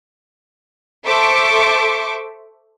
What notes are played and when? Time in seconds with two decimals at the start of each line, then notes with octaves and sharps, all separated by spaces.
1.06 A4 C5 E5 C#6 D6